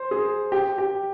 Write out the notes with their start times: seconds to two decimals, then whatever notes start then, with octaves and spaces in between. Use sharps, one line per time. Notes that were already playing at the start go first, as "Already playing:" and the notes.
Already playing: C5
0.11 G#4
0.52 G4
0.78 G4